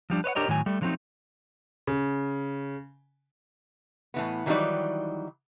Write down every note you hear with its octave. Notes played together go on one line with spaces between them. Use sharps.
F3 G3 D4
B4 C#5 D#5 F#5
D4 G4 A#4 C#5 D#5
A2 D#3 F#3 G#5
G3 A3
D3 F3 F#3 A3 C4 D#4
C#3
A2 E3 B3
D#3 E3 F#3 G3 D#4 D5